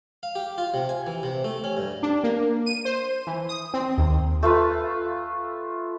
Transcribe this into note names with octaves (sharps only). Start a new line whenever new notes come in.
F5
G4
F4
C3
G#5
E3
C3
A3
C#4
G2
D4
A#3
D#7
C5
E3
D#6
C4
D#2
A3 F4 B4